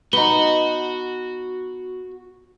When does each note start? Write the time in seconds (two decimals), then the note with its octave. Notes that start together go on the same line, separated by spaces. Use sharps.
0.13 B3 D#4 F#4 G7